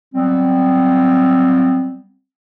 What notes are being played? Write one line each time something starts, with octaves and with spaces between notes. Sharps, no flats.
F#3 G3 B3 C4